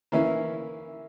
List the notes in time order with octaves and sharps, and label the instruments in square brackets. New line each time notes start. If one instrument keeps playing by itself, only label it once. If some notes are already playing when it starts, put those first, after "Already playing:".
[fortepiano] E3 A#3 C#4 E4